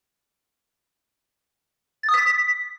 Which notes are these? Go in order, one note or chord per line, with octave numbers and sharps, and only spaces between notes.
A6
D#6
B6